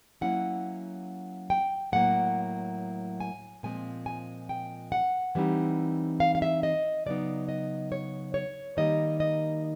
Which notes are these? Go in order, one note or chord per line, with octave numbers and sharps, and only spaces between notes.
F#3 A#3 C#4 E4 F#5
G5
A2 F#3 A#3 F#5
G#5
A#2 F3 G#3 C4 G#5
G#5
G5
F#5
E3 G3 C4 D#4
F5
F5
E5
D#5
C#3 F#3 B3 D#4 D5
D#5
C#5
C#5
D#3 G3 A#3 D#4 D#5
D#5